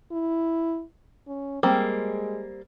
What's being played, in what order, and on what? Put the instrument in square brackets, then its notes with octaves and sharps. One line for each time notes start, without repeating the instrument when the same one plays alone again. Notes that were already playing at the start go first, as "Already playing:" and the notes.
[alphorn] E4
C#4
[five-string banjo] G3 A#3 C4 [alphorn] G#3